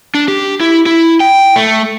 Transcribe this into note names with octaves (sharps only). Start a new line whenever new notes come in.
D4
G4
E4
E4
G5
A3